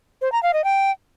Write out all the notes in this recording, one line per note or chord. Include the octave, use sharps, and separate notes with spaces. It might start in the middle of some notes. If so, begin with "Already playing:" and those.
C5
A#5
F5
D#5
G5